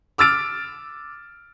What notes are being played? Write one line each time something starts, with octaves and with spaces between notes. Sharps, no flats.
D6 E6 F6 A6 D7